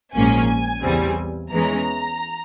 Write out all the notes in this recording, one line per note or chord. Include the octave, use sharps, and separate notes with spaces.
A#1 G#2 F3 A#3 C#4 G#5
E2 C#3 G3 C4
E2 E3 G#3 C#4 A#5